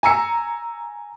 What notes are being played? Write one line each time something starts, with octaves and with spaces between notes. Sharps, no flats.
G#5 A#5 E6 C#7